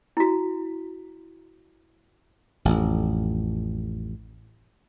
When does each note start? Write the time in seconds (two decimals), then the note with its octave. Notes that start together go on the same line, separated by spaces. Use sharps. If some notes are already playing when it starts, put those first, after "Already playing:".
0.17 E4 F#4
2.65 A1 F2